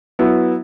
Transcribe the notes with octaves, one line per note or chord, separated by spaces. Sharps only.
F#3 B3 E4